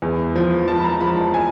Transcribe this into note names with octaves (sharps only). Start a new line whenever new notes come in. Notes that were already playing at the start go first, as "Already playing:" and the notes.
E2
F3
F3 A5
B5
A#5
F3 B5
A5
G#5